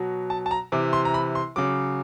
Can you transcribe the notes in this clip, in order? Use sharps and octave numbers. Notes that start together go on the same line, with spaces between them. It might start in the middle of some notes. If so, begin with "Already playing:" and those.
Already playing: B2 F#3
A5
A5
A#5
C3 E3 D6
C6
A#5
B5
C6
C#3 F#3 D6